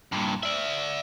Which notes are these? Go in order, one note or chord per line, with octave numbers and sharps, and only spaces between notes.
G2 A#2
D5 E5